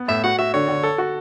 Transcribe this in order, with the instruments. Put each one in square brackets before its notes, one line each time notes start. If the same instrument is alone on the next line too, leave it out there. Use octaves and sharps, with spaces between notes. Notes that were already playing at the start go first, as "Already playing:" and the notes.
Already playing: [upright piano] B3
[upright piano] A2 [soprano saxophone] E5
[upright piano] F#4 [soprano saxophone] F#5
[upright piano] F#4 [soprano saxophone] E5
[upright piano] D3 [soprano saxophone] C#5
[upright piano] D3
A4
F#4